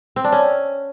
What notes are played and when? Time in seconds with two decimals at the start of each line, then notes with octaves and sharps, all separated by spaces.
0.16 C4
0.24 D4
0.32 C#4